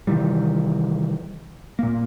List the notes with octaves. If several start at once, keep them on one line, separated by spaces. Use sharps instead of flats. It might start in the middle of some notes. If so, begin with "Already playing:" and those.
C3 D#3 E3 G3
A#2 A#3